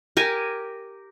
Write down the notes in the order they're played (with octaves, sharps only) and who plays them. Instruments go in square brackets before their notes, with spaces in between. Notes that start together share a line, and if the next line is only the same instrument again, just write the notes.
[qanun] G4 A#4 G#5